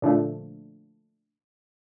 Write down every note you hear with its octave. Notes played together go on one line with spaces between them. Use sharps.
A#2 D3 F3 A3